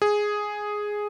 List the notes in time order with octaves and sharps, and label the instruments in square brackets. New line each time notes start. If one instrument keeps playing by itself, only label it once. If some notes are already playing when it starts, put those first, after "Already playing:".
[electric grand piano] G#4